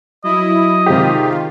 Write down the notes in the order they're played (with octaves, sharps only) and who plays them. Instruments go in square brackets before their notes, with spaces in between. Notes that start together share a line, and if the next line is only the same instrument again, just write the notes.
[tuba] F#3 [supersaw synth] E4 [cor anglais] D#5
[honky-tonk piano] C3 G#3 G4 [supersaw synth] D#3 F4